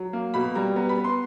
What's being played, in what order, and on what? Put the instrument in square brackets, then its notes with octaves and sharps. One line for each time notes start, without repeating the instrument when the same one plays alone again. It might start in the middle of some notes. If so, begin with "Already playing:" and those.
Already playing: [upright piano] F#3
A#3
B2 B5
G3 A#5
B3 A#5
B5
B3
C6